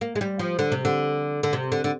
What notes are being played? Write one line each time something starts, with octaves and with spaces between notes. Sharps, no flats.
A#3
G#3
G3
F3
D3
C3
D3
D3
C3
D3
D3